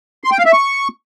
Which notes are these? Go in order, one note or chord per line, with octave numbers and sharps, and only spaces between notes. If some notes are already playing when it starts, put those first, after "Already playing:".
C6
G5
F5
E5
C#6